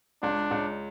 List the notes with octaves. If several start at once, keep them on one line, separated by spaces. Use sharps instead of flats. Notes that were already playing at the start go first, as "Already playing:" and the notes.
C#2 D4
C#2